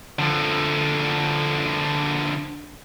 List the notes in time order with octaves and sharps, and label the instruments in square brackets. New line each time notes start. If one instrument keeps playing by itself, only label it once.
[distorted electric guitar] D3 F3